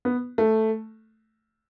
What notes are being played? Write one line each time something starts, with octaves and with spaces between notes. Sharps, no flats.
B3
A3